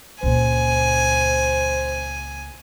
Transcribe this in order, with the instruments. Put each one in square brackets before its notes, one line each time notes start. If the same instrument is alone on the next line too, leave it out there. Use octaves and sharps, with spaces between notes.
[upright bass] C#2 A#2 [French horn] C5 [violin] G#5